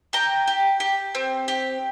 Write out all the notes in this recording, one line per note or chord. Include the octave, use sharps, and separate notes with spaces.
G4 G5 A#5
G4
G4
C4
G4